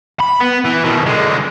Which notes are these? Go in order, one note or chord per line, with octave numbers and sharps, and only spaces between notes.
B5
B3
E3
B2 D#3
D3 G#3